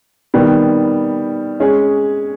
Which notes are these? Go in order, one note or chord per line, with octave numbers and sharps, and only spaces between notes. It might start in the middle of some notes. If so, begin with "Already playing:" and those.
D#3 G3 B3
G#3 C#4 G#4